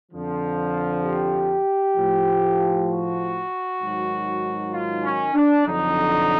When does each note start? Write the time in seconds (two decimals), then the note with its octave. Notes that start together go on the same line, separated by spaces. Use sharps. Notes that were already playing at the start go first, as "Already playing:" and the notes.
0.12 F2 D3 F3
1.04 G4
1.97 A2 F3
2.89 F#4
3.81 G#2 D#3 F#3
4.73 F4
5.04 C#4
5.34 D4
5.65 F2 D3 F#3 D#4